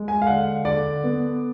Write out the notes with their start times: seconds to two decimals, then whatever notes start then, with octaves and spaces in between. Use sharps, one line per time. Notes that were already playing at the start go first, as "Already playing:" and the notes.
Already playing: G#3
0.08 G#5
0.22 F5
0.27 D3 F#5
0.65 D3 D5
1.04 B3